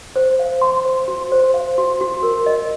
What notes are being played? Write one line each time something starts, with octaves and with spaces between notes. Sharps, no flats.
C5
F5
C6
C5
F#4
C5
F5
F#4
F#4
A#4
D#5